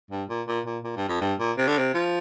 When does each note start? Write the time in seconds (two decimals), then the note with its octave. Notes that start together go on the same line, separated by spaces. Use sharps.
0.11 G2
0.29 A#2
0.48 A#2
0.66 A#2
0.84 A#2
0.96 G2
1.09 F2
1.21 G2
1.39 A#2
1.57 C3
1.67 D3
1.78 C3
1.94 F3